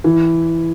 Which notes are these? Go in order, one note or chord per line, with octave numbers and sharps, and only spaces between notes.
E3